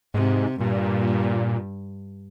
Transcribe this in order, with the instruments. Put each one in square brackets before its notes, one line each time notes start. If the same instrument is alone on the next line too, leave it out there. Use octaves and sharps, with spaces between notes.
[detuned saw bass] G#2 [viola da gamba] C3
[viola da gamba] G2 [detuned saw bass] A#2